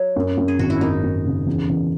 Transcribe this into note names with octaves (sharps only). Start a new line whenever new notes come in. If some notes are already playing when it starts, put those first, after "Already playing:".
Already playing: F#3
F#2
F#2
G#4
G#1 F#4
E4
F#2 D#4
F#2
C#3
E2
E2